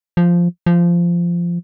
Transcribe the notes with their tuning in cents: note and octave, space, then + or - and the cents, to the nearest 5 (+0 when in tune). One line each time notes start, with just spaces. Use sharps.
F3 -5
F3 -15